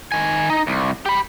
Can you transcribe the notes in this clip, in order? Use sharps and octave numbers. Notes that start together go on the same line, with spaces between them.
D#3 G#5
D#4
C2
G4 B5